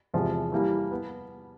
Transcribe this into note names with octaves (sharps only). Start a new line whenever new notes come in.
E2 C3 F3 G#3
E3 G3 A#3
B3